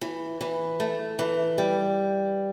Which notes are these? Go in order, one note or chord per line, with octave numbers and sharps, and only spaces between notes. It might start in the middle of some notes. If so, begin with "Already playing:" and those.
E3
E3
A3
E3
G3